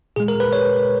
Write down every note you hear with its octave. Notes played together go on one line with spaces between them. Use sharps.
A#2 G#3 G#4
A#4
B4
C#5